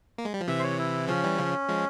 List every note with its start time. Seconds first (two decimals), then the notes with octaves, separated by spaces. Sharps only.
0.18 A#3
0.25 G#3
0.34 G3
0.41 F3
0.48 C3 E3 E5
0.59 C5
0.64 C#5
0.78 E4
1.08 C#3 F3 C#4
1.23 E3 G3
1.38 C#3 F3
1.69 F3 G#3